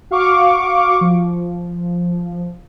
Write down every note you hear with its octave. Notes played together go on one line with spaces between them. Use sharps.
F#4 F5 C#6 D6
F3